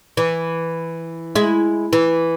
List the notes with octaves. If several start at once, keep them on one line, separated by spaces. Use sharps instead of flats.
E3
G#3 E4
E3